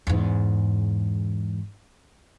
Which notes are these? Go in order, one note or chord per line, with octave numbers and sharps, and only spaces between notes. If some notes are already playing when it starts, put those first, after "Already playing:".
E2 G#2